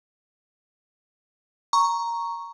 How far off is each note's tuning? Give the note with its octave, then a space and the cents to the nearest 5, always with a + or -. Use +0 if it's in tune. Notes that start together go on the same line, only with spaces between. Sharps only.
A#5 +0 C#6 +0